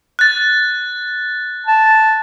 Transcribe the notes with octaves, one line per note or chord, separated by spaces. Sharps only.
F#6 A6
A5